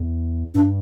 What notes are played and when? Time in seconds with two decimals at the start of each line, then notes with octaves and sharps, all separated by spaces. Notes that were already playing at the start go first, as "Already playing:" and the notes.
Already playing: E2
0.54 G2 D4